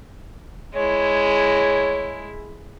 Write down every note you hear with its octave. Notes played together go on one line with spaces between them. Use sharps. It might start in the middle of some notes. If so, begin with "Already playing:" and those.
G#3 E4 C#5